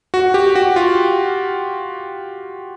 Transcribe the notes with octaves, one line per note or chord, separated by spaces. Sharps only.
F#4
G4
F#4
F4